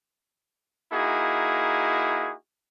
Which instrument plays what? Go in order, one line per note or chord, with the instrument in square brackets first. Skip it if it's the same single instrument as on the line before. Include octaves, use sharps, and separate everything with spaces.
[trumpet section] A#3 D#4 E4 F#4 G#4